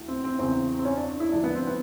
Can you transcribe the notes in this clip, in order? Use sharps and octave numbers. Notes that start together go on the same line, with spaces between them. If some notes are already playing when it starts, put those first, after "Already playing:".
Already playing: D2 E3
C4
C4
E2 C#3 E3 C4
C4
C#4
D4
E4
D#2 D3 F3 D4
B3
C4
B3